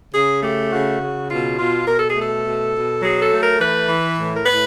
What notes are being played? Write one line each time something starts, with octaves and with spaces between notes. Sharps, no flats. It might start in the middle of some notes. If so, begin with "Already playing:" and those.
C#3 G#4
A3 G4
C#3 F#4
C#3
B2 F4
B2 F4
B2 A#4
A4
G#4
A3 A4
B2
B2
F#3 G#4
A4
A3
A#4
E3 B4
E3
A2
A#4
A2 B4